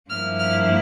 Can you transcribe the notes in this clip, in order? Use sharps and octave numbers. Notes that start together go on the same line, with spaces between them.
G2 F3 A#3 E4 F6
F6